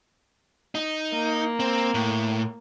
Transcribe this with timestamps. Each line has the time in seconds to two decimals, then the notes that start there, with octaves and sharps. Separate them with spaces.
0.75 D#4
1.14 A#3
1.60 C4
1.94 A2